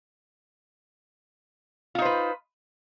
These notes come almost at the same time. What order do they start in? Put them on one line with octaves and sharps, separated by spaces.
F4 D#4 C5 B4